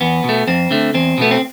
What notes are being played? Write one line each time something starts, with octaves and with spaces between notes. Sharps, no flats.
E2 B3
B2 A3
F2 C4
D3 A3
E2 C4
B2 A3 B3
C4